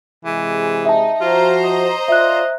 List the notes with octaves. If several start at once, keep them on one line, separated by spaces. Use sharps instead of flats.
C3 E3 G#3 G#4
D#4 E5 A5
F3 F4 F#4 C5 A#5
D#5
F4 D5 E5 F#6